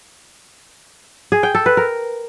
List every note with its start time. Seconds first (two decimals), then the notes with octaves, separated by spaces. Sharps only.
1.32 G#4
1.43 G5
1.55 A4
1.66 B4
1.77 A#4